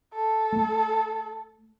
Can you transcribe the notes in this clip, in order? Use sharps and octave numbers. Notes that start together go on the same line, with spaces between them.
A4
A3